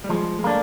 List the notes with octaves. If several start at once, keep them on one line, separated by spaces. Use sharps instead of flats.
G3
F3 G#3
G#3
A3 A#3 D4